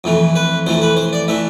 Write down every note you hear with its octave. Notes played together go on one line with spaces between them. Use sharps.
F2 E3 A3
B4
F2 E3 A3 C5
B4
C5
D5
E3 A3 E5